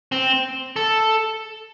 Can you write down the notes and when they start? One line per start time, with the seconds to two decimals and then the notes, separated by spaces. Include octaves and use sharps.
0.12 C4
0.76 A4